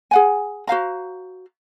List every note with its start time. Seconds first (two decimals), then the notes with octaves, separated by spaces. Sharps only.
0.11 G#4 F#5 G#5
0.67 F#4 C5 F5 A#5